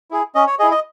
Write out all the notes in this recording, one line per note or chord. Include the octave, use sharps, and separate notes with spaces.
E4 G#4
C#4 D#5
C#5
E4 G#4 D#5
D#5